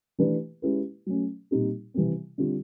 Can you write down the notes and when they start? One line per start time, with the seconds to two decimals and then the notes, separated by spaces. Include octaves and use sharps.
0.19 E3 A3 D4 G4 B4
0.62 G#3 C#4 E4 G4 B4
1.06 F#3 A3 C#4
1.51 A#2 G3 C4 D#4 G4
1.94 C3 E3 G3 C4
2.38 D3 G3 C4 F4